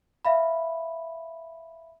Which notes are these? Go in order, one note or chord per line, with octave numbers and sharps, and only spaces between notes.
E5 F5 B5